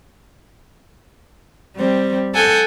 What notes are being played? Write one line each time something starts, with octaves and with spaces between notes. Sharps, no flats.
G3 C4
A4 F#5 G#5 G6